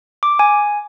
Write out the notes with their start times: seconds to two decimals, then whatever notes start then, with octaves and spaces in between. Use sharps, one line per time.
0.23 D6
0.39 G#5